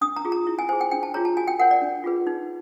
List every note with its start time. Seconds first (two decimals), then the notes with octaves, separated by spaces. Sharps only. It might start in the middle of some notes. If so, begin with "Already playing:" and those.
0.01 D4 D#6
0.16 A#5
0.25 F4 G#4
0.32 A#5
0.47 E4
0.59 G#5
0.69 G#4 C5 G#5
0.81 G5
0.91 D4 G5
1.03 A5
1.14 F4 G#4 C#5 A#5
1.25 A5
1.37 F#4 G#5
1.48 G5
1.59 A#4 C#5 F#5
1.71 D5
1.82 D4
2.04 F4 G#4 B4
2.27 D#4